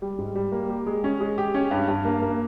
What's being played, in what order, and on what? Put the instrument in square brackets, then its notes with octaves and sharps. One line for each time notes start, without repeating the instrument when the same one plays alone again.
[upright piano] G3
G#2
G3
A#3
G4
G#3
C#4
G#3
G4
C#4
G2
G2
A#3
A#3